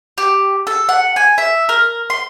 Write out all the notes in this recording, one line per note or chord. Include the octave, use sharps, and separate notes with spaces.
G4
A4
F#5
G#5
E5
A#4
C6